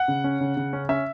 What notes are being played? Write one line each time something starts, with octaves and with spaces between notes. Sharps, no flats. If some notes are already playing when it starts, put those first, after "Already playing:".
Already playing: F#5
C#3
C#4
C#3
C#3
C#4
C#4 E5